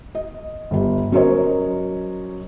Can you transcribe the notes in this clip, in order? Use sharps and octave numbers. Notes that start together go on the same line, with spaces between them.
D#5
G1 G4
F#3 C#4 A#4 C5 C#5 D#5